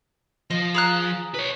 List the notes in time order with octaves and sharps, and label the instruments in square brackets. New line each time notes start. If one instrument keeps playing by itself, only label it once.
[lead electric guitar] F3 [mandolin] D#5
[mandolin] G#4 A#5 F#6
[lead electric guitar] B4 C#5